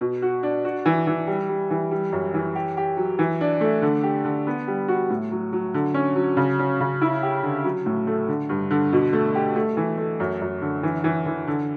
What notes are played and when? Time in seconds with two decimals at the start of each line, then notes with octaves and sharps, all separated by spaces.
0.01 B2
0.22 F#4
0.43 D4
0.65 F#4
0.86 E3
1.07 E3
1.27 G3
1.49 G3
1.70 E3
1.91 G3
2.12 F#2
2.34 E3
2.55 G4
2.77 G4
2.97 F#3
3.19 E3
3.41 D4
3.61 A3
3.82 D3
4.03 G4
4.25 D3
4.47 B3
4.68 G3
4.88 F#4
5.10 A2
5.32 F#3
5.53 F#3
5.74 D3
5.94 C#4
6.16 F#3
6.37 C#3
6.59 C#4
6.80 C#3
7.01 E4
7.23 G4
7.43 D3
7.64 F#3
7.86 A2
8.07 A3
8.28 D3
8.49 G2
8.71 D3
8.93 B2
9.13 A3
9.35 G4
9.56 A3
9.77 E3
9.98 A3
10.20 F#2
10.41 F#2
10.62 D3
10.83 E3
11.04 E3
11.26 E3
11.47 D3